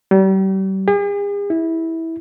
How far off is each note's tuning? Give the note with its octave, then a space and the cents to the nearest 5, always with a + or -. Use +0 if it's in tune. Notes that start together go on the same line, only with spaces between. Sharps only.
G3 -35
G#4 -45
E4 -15